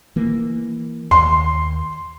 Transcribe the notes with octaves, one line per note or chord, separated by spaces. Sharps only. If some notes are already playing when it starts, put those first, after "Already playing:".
E3 A#3
D#2 C6